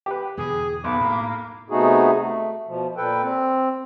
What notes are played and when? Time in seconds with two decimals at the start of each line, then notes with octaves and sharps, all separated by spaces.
0.06 G4 B4
0.37 E2 B2 D3 G#4
0.84 B1 B3 B5 D6
1.01 A2 A#3
1.70 C3 A3 B3 D#4 F#4 G#4
2.18 A3
2.68 B2 F3
2.97 A#2 A4 B4 G5
3.22 C4